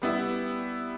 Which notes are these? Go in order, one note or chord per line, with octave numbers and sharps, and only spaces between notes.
G3 B3 E4